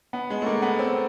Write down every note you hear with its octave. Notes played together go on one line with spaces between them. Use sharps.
B3
G#3
A3
A#3
B3
C4